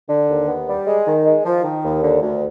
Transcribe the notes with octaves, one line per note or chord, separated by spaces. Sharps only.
D3
D#2
B3
G3
G#3
D#3
G#3
F3
D#3
D#2
D3
D2